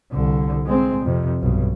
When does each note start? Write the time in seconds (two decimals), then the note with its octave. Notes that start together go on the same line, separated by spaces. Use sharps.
0.11 C2 D3
0.66 G#3 C4
1.05 F2 C3
1.41 B1 G2